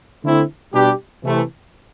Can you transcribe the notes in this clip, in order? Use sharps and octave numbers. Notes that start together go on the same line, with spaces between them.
D3 A3 C4 E4
B2 G3 D4 G4
C3 E3 A3